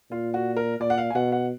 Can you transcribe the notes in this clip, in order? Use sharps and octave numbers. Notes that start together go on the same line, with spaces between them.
A#2 F4
F#4
A#4
A#2 D5
F#5
F5
G#5
B2 F#5
F#5